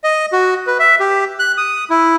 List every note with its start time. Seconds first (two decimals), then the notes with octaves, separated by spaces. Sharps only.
0.04 D#5
0.33 F#4
0.67 B4
0.79 E5
1.00 G4
1.39 F#6
1.58 D#6
1.90 E4